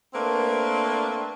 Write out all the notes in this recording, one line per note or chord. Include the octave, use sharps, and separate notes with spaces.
A3 A#3 C4 D4 A#4 B4